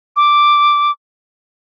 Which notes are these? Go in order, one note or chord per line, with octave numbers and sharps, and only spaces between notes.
D6